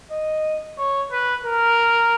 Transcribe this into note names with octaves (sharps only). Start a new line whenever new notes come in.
D#5
C#5
B4
A#4